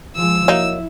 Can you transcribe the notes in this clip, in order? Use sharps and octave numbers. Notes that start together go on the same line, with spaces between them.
F3 G#3 E6
F#3 A#3 D#4 E4